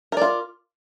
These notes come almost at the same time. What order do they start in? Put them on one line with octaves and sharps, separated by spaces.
A#4 D5 F4